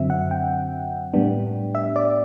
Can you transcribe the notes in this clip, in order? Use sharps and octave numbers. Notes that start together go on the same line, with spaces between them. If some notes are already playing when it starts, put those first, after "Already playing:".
Already playing: F#2 D3 F#3 C4 E5
F#5
G5
A2 G3 B3 D4
E5
D5